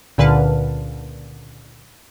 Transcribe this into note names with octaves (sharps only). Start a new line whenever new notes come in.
C#2 A#2 D3 B4 A5 F6